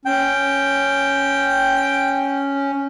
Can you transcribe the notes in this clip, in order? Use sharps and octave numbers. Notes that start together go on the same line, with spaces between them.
C#4 G5